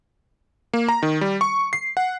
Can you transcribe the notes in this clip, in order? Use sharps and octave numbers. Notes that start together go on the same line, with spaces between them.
A#3
A#5
D#3
G3
C#6
C7
F#5